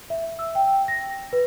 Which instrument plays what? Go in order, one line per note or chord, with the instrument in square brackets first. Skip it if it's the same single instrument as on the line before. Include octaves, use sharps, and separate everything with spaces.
[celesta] E5
E6
G5
A#6
B4